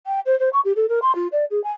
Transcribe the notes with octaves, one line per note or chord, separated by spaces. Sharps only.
G5
C5
C5
C#6
G4
A4
A#4
C6
F4
D5
G#4
G#5